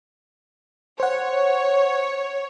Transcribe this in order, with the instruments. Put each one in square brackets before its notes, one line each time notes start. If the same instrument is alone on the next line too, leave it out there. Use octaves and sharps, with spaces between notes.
[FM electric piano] C5 F#5 [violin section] C#5